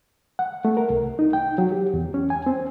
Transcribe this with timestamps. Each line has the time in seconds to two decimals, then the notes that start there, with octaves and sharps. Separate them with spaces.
0.39 F#5
0.65 A3
0.77 A#4
0.90 C2
1.19 D#4
1.33 G5
1.58 F#3
1.72 G4
1.94 E2
2.14 C#4
2.30 G#5
2.47 C4